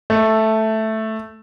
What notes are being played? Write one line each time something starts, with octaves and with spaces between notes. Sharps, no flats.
A3